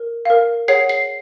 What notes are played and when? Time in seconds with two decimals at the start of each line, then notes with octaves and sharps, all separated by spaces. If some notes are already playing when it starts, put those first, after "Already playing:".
Already playing: A#4
0.25 A#4 F5
0.68 G#4 C#5 F#5 C7
0.89 C7